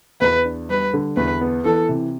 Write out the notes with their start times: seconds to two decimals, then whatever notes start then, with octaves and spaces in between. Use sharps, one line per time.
0.21 E2 B4
0.45 D4
0.69 G3 B4
0.93 D3
1.17 E2 B4
1.41 B3
1.65 E3 A4
1.89 C3